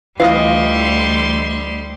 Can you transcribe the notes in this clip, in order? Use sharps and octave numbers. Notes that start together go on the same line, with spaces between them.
D2 E3 G3 F4 D#5 F5 C6